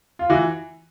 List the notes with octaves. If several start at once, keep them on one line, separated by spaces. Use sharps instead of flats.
F4
E3 F#4